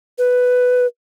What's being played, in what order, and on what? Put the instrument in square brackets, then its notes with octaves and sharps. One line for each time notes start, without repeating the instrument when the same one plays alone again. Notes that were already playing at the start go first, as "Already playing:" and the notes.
[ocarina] B4